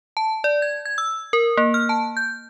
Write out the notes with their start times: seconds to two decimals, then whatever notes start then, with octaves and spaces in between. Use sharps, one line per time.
0.17 A5
0.44 D5
0.62 G#6
0.85 G#6
0.98 E6
1.33 A#4
1.57 A#3
1.74 F6
1.89 A5
2.17 G6